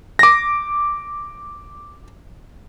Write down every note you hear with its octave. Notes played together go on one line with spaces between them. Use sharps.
D6 A#6